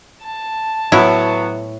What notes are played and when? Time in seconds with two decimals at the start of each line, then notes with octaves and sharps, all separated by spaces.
0.23 A5
0.92 A2 F#3 B3 E4